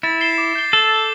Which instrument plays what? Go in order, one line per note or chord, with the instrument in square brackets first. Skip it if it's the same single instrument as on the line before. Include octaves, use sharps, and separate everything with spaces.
[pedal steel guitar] E4 [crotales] A6
[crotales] C7 E7 G7
D6
G6 C7 G7
[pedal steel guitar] A4 [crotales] A6
[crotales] C7 G7